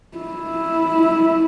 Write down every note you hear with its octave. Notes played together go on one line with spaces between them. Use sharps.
E4